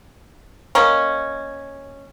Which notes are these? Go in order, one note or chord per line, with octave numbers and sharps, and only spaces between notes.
A#3 C#4 D#5